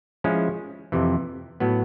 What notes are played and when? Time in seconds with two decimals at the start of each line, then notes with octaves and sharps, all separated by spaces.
0.24 F3 G#3 C#4 E4
0.92 F2 C3 E3
1.60 A2 F#3 B3